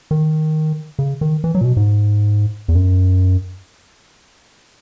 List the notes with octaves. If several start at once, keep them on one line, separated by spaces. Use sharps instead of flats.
D#3
C#3
D#3
E3
F#3
A#2
B2
G#2
E2
F#2